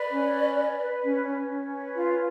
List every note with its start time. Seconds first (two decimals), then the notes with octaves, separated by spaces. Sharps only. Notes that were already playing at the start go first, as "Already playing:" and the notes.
Already playing: B4 D5
0.09 C#4
0.32 B4
0.55 B4
0.79 B4
1.02 C#4
1.25 C#4
1.49 C#4
1.72 B4
1.95 F4